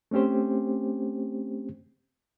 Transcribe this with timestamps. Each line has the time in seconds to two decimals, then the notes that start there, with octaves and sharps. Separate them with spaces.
0.11 A3 C4 C#4 G4 C5